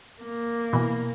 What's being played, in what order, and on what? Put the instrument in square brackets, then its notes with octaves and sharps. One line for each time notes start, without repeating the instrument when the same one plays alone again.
[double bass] A#3
[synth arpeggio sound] B2 E3